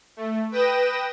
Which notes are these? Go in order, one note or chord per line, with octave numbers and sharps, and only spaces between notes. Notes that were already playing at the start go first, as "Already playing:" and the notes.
A3
B4 G5 D#6 A#6 E7